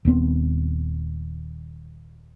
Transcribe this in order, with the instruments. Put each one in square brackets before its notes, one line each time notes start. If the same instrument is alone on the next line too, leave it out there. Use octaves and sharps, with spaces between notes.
[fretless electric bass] D#1 D#2 B3 C4